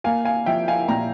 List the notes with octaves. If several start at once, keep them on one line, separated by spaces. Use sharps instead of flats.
A#3 F5 G#5
F5 G#5
F3 E5 G5
F5 G#5
A#2 G5 A#5